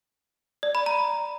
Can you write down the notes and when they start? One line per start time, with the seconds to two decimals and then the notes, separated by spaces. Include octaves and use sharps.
0.63 D5
0.75 B5
0.86 A#5